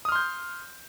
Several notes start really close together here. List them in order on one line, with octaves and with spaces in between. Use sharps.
D#6 F6 C6 G6